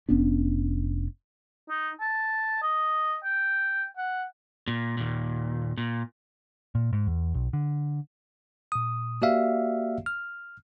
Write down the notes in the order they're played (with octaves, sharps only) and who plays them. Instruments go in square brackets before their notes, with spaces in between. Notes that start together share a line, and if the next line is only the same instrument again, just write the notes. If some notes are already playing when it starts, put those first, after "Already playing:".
[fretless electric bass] F1 B3 C#4 D4
[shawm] D#4
A5
D#5
G5
F#5
[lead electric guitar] A#2
D#2 A#2
A#2
[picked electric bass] A#2
G#2
E2
B1
D3
[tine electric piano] A#2 D#6
A#3 F#4 G4 D5 E5 F5
F6